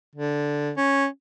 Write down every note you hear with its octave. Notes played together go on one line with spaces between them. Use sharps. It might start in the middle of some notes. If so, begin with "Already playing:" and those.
D3
C#4